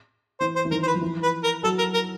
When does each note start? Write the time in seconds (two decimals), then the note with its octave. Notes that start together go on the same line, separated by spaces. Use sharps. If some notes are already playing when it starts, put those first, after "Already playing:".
0.40 E3 C5
0.56 C5
0.65 E3
0.71 D#3 A#4
0.83 C5
0.87 B4
0.94 F3
1.01 E3
1.23 B4
1.44 A#4
1.63 F#3 A4
1.78 A#4
1.94 A#4